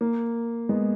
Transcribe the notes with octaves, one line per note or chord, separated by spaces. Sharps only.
A#3
G#3 B3